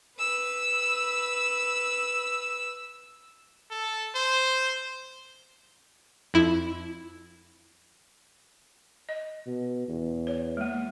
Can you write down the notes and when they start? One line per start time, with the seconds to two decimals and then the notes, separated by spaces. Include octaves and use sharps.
0.17 B4 E6
3.71 A4
4.15 C5
6.34 F2 E4
9.09 D#5
9.46 B2
9.88 E2
10.27 C#5
10.57 G#3 A#3